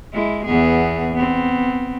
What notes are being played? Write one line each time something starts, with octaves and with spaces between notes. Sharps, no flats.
G#3 E4
E2 B3 G#4
B3 C4